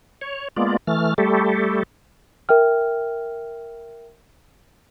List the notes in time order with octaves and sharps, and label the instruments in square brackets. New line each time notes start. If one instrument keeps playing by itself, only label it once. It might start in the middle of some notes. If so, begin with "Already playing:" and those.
[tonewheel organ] C#5
G#3 A#3 B3 F4 D5
E3 A3 F6
G3 A3 G4 A4
[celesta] A#4 E5 G5 F6